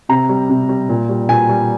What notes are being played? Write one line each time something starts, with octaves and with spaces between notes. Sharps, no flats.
C3 A#5
G3
C3
G3
A#2
G3
A#2 G#5
G3